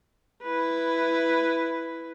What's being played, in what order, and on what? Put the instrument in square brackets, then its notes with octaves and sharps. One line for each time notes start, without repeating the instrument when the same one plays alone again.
[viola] E4 B4